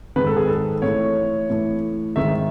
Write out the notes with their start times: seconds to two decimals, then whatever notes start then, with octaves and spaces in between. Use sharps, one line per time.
0.16 G#2 D#3 B4
0.27 A4
0.37 G#4
0.48 A4
0.82 A2 E3 C#5
1.50 A2 E3
2.16 G#2 D#3 E5